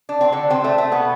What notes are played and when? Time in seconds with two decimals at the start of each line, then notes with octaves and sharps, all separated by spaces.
0.09 D4
0.21 C4
0.33 D3 D4
0.50 C3 C4
0.64 A3
0.78 A3
0.92 B2 B3